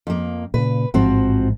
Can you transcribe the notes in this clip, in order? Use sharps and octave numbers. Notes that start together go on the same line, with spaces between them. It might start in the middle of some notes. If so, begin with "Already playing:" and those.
F2 A#3
A#2 C#3 B4
A1 G#2 F3 C4 F#4